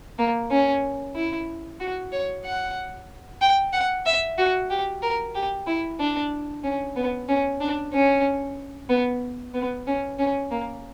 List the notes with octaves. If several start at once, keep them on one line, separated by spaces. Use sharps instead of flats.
A#3
C#4
E4
F#4
C#5
F#5
G5
F#5
E5
F#4
G4
A#4
G4
E4
D4
C#4
B3
C#4
D4
C#4
B3
B3
C#4
C#4
A#3